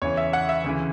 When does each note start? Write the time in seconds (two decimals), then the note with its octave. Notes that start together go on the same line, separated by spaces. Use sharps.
0.02 E2 C#3 E3 C#5
0.17 E5
0.33 F#5
0.49 E5
0.64 D2 C#3 E3